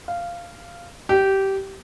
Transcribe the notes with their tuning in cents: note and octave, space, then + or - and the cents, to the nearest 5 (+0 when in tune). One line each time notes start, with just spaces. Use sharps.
F5 -10
G4 -15